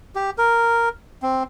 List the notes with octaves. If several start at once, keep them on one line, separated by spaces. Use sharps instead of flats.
G4
A#4
C4